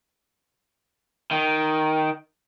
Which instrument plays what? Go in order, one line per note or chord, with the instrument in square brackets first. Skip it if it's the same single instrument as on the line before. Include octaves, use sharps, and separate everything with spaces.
[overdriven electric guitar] D#3